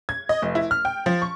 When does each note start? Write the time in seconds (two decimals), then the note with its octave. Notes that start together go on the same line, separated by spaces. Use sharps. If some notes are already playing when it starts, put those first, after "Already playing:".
0.09 G#6
0.29 D#5
0.42 F1
0.55 E4
0.71 F6
0.85 G5
1.06 F3
1.22 C#6